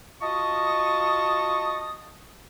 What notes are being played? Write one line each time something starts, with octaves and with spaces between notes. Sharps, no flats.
F4 F#4 D#5 A5 C#6 D#6